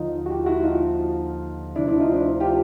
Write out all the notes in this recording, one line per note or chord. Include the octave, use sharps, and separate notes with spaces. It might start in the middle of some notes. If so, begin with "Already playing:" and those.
Already playing: D#2 D3 F3 D#4 F4
F#4
F4 G4
E4 F#4
D#4 F4
D2 C3 F3 D4 E4
D4 E4
D#4 F4
D4 E4
F4 G4